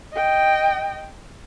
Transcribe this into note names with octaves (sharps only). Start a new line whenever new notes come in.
D#5 G5